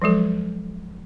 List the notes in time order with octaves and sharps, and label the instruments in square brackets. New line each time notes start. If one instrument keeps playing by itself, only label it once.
[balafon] F3 F#3 G#3 A4